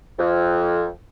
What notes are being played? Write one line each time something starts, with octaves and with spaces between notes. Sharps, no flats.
F2